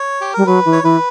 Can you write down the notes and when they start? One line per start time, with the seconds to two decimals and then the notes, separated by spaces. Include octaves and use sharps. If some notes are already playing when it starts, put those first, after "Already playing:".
Already playing: C#5
0.21 G4
0.34 G3 A#4
0.46 F#3 B4
0.65 E3
0.72 C#5
0.83 E3 B4